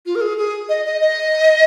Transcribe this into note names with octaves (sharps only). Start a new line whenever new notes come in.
F4
A#4
G#4
G#4
D#5
D#5
D#5